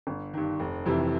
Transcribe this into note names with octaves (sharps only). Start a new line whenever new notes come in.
G1
G2 D#3
F1
F2 C3 E3